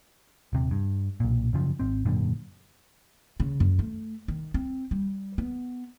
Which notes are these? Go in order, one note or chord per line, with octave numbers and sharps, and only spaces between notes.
D#1 C3
G2
B1 A#2
F#2 C#3 F3
G#1 C4
G#1 F#2 A#2 D3
C#3
F#2
A3
D#3
C4
G3
B3